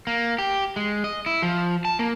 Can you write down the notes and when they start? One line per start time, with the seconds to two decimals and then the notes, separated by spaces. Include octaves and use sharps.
0.07 A#3
0.39 G4
0.76 G#3
1.04 D#5
1.26 E4
1.42 F3
1.85 A5
1.99 A#3